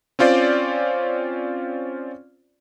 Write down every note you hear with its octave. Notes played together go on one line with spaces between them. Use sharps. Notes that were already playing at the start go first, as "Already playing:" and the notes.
C4 C#4 F4 C5 D5